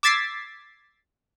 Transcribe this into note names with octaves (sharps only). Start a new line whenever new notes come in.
D6 E6 G#6 A6 B6 C7